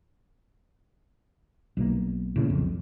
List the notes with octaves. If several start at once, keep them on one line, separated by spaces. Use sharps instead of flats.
B1 B2 A#3
A2 C#3 A#3
B1 F2